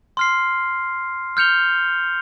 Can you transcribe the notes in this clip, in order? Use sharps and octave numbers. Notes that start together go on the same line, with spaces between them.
C6 F6 C7
F6 G6 C#7 F7 G7